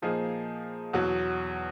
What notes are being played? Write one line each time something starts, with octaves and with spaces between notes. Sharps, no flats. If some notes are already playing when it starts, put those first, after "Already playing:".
A#2 F3 A#3 D#4 G#4
E2 B2 F#3